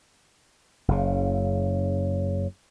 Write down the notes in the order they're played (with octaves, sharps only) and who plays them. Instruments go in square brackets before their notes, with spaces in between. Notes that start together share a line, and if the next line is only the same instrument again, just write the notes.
[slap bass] F#1 C#3